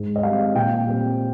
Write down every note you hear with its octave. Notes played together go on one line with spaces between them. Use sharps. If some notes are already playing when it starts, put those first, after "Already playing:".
Already playing: G#2
D#5
G3 C4 F5
A#2 G5
G3 C4